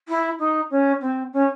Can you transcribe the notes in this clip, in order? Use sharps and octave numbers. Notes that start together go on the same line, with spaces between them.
E4
D#4
C#4
C4
C#4